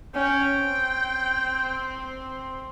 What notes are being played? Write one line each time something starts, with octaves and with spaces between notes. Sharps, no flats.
C#4 G5
C4